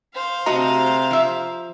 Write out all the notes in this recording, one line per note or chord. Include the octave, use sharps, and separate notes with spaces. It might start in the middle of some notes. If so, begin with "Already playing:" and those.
C5 F5
C3 A3 F#4 D#5 A#5
F3 E5